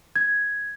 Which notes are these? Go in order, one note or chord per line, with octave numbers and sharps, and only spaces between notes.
G#6